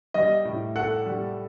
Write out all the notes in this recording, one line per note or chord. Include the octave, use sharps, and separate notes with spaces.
G3 D#5
A2
A4 F#5
G3